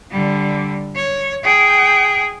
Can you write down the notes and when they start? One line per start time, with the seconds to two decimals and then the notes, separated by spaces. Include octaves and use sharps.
0.11 D3 G3
0.95 C#5
1.44 G#4 G5